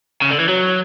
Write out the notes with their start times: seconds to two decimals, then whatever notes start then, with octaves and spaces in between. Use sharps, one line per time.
0.22 C#3
0.31 D3
0.39 E3
0.48 F#3